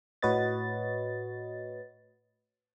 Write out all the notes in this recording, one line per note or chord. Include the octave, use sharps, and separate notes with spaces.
A2 F#4 B4 C#5 D#5 A6